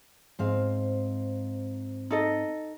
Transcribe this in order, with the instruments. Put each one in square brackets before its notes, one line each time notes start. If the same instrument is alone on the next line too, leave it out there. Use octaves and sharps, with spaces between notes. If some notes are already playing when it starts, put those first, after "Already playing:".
[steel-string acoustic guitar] G#2 C4 F5
[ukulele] D#4 A4 D#5